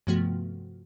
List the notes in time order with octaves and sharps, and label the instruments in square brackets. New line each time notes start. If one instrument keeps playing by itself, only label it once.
[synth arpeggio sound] G2 C3 F3 A3 B3 F#4